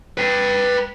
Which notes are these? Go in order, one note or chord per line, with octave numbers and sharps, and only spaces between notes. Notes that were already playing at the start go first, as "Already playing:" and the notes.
B4 G5